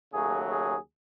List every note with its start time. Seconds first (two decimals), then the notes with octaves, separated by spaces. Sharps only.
0.11 D#2 C#3 F#3 A3 G#4
0.51 G#4